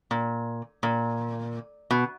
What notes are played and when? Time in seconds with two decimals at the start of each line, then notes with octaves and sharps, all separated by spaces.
0.11 A#2
0.83 A#2
1.91 B2